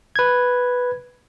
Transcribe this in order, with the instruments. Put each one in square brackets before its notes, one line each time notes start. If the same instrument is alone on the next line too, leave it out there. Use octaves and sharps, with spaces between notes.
[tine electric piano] B4 G#6